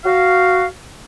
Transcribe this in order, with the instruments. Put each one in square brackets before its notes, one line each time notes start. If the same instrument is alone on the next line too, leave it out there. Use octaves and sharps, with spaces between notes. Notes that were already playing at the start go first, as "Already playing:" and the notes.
[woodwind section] F#4 F5